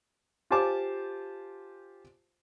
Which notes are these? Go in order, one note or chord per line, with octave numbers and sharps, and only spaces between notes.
F4 G4 C5 G#5 A5 D6